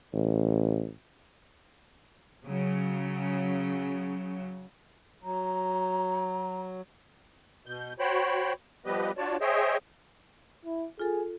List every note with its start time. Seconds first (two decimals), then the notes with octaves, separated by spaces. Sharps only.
0.14 A1
2.44 C#3 F#3
5.23 F#3 A#5
7.66 B2 G6
7.99 F#4 C5 C#5 G5 B5
8.86 F3 G3 B3 G4 B4 D#5
9.17 D4 F4 F#4 C#5 D5 A5
9.41 G#4 C5 C#5 D#5 E5 G5
10.65 E4
11.00 F4 G#4 A4